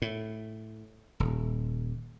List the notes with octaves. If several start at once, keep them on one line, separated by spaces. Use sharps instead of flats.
A2
D#1